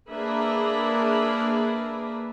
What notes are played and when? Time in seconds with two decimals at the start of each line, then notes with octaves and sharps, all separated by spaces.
0.10 A#3 D4 G#4 A#4 B4 E5